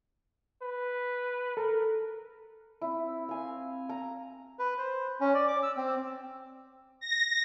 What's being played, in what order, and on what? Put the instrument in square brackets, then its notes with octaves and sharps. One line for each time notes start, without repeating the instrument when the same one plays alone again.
[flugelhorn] B4
[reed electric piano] A4 [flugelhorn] A#4
[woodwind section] C4 [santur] E4
[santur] F5 G#5
A#5
[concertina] B4
C5
C#4
D5
D6
E6
C4
[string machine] A#6